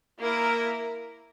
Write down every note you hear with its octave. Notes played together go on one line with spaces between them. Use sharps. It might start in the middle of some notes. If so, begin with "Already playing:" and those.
A#3 E4 A#4